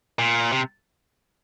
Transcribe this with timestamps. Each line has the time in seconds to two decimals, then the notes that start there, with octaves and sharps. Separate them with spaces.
0.19 A#2
0.52 C3